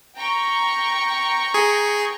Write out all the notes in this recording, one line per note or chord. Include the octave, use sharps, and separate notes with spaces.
G5 A#5 C#6
G#4